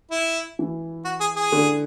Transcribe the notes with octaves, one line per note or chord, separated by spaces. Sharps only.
E4
E3
F#4
G#4
G#4
D3